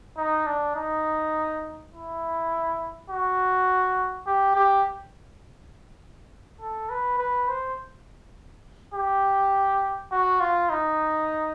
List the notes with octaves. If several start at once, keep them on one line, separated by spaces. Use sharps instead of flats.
D#4
D4
D#4
E4
F#4
G4
G4
A4
B4
B4
C5
G4
F#4
F4
D#4